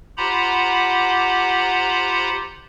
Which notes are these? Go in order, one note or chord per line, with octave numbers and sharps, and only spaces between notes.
F4 G4 C5 F#5 A#5 B5